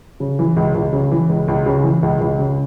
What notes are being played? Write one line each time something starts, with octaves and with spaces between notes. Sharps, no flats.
C#3
E3
C#2
C#2
C#3
E3
C#2
C#2
C#3
E3
C#2
C#2
C#3